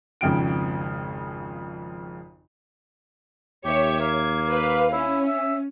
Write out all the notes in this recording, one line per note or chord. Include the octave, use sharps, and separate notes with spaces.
G#1 F2 C#3 G5 D7
D#2 G4 C#5 E5 C#6
A#3 G#6
B4 F5
C#4 E4
E5